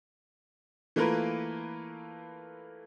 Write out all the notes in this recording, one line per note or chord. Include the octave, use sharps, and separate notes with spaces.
E3 A3 A#3 F4 A#4 B4